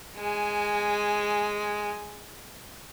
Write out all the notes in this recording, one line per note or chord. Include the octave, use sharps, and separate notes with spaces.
G#3 G#5